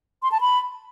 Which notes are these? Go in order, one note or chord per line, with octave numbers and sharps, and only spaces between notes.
C6
A5
B5